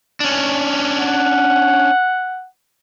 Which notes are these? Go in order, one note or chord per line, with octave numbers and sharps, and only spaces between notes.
C#4 D4
F#5